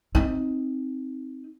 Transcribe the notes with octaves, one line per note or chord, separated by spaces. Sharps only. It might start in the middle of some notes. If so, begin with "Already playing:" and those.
C4 D#4